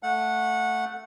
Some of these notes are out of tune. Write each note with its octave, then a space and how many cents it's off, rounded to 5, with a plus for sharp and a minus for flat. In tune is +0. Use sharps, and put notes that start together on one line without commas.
A3 +0 F#5 -15